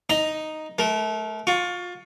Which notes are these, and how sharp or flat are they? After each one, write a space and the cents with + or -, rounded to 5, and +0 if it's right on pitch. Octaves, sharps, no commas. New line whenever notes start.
D#4 +0 D#5 +0 A#5 +5
A3 -30 A#4 +0
F4 +25 C#6 +15